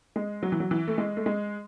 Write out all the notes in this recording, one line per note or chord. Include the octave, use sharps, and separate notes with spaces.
G#3
F#3
E3
F#3
E3
A3
G#3
A3
G#3